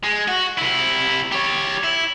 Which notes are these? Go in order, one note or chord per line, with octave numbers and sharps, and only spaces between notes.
G#3
F#4
C3 E4
G4 C#5
E4